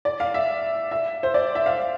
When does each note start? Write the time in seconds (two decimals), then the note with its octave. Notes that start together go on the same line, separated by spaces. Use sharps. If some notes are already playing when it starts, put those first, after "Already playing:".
0.05 D5
0.20 F5
0.34 E5
0.91 E5
1.23 C5
1.34 D5
1.55 E5
1.66 F5